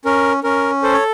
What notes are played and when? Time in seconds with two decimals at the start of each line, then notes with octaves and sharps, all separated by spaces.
0.05 C#4 A#4
0.44 C#4 A#4
0.83 A4 C5
0.93 C#5